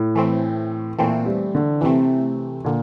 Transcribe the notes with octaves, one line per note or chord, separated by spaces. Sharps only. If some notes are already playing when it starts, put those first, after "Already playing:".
Already playing: A2
E3 A3 C4
A#2 E3 A3 C4
G3
D3
C3 E3 A3 C4
A#2 D3